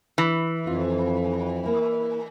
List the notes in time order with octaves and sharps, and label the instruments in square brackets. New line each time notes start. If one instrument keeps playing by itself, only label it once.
[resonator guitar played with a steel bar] E3
[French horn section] F2 [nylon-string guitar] F4
[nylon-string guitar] A#3 E4